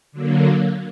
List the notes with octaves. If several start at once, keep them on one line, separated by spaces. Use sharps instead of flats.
D3 F#3 A#3